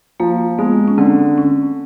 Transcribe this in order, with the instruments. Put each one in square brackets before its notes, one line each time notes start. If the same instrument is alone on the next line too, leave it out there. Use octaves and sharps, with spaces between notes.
[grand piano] F3 [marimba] A#3
[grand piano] G#3 [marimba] B3
[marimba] C#4
[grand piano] D3 [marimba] C4
[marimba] C#4